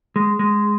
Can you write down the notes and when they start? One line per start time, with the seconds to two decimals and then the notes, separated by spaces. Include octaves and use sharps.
0.16 G#3
0.39 G#3